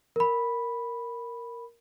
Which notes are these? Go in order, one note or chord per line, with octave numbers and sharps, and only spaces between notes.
A#4 B5